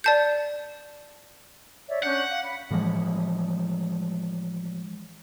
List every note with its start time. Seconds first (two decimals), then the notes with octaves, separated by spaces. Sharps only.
0.04 D5 A5 G6
1.88 C#5 D5 E5
2.03 C#4 D4 F#5 G6
2.29 F5
2.44 B5
2.71 A2 E3 F3 G#3